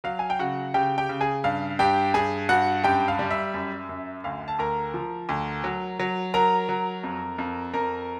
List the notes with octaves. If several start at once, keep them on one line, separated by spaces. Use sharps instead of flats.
F#3 F5
G#5
G5
C#3 F#4 F#5
C#3 G4 G5
G4 G5
C#3
G#4 G#5
G2 F5
G2 G4 G5
G2 G#4 G#5
G2 F#4 F#5
F#2 G4 G5
F5
G3
E5
F#2
F#2
D2 F5
A5
D2 A#4 A#5
F3
D2
F#3
F#3
F#3 A#4 A#5
F#3
F2
F2
F2 A#4 A#5